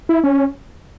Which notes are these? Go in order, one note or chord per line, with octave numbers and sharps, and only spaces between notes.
E4
C#4